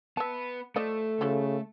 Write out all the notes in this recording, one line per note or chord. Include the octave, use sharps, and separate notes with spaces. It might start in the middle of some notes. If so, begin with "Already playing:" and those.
B3 B4 E5 A5
F3 A3 A4 D5 D#5
C#3 F3 E4 F#4